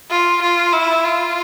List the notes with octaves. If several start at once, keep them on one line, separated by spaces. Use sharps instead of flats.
F4
F4
E4
F4